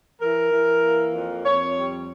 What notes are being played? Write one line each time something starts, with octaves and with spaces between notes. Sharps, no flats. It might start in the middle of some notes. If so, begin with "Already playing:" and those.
E3 A#4
E3
A#3
F2
F2 C#5
G3